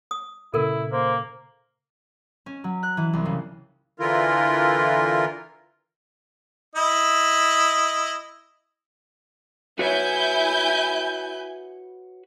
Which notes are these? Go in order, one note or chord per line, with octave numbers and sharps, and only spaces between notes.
D#6
A#2 C#3 E4 A4 A#4
A#3 C5
C#4
F#3
F#6
E3
C2
C#3
D3 E3 E4 F4 A#4
E4 D#5
E4 F#4 B4 C#5 G#5 G6